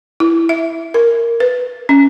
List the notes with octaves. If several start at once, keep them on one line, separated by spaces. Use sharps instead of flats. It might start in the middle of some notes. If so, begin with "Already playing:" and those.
E4
E5
A#4
B4
C#4